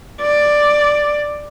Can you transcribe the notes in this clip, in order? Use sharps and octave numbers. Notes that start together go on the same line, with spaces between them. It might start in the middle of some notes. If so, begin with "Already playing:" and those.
D5